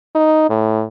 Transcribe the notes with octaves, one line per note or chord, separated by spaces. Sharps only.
D#4
A2